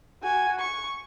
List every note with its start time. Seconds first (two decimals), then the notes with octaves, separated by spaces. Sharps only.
0.22 F#4 G#5
0.59 C#6